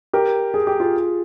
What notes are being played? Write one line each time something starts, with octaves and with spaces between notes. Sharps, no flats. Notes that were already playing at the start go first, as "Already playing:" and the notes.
G4 A#4
G#4
G4
F4 G#4